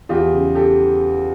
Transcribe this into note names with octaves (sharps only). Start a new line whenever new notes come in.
E2 F4 G4
C#3
G4 A4